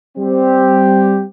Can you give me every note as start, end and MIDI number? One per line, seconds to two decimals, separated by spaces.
0.18 1.23 55
0.18 1.23 60
0.18 1.23 67